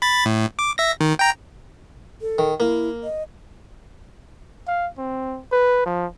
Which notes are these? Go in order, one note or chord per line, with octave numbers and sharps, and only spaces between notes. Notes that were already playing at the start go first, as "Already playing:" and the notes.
B5 A6
A2
D6
E5 A#6
D#3
G5 A#5
A4
D#3
A#3 E4
D#5
F5
C4
B4
F3